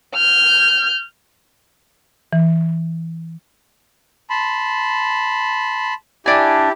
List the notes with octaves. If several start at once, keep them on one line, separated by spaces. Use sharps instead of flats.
F6 G6
E3
A5 B5 C6
D4 E4 G4 G#5